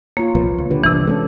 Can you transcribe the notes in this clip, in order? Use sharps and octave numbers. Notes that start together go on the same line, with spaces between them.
A#3 F4 C#5
C2 A#2 F3 B4
C#2
D3 G4 B4
G1 C2 C3 E3 D4
G#3 C4 C#4 A4